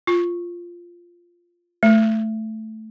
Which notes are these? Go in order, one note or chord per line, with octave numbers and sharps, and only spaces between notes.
F4
A3